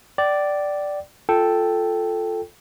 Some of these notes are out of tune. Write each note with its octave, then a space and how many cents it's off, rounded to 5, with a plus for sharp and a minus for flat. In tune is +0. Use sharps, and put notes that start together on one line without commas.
D5 +0 G5 -35
F4 +0 A4 +0 G5 +0